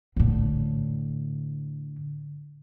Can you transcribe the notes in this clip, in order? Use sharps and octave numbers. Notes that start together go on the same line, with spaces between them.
A2 D3